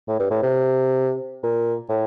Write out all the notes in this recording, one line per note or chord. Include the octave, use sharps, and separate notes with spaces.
A2
G2
A2
C3
A#2
A2